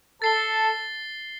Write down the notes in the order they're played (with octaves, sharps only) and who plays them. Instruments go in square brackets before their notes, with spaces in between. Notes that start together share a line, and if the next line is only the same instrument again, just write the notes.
[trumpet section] A4 [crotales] A6 C7 G7